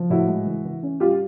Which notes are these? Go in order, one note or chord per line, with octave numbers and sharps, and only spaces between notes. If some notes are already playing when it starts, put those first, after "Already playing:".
Already playing: F3
A2 E4 F#4
G#3
E3
E3
C#4
G3 F4 G4